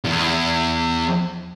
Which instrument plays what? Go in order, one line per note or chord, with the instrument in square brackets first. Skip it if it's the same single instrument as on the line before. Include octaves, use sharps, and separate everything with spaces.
[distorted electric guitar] E2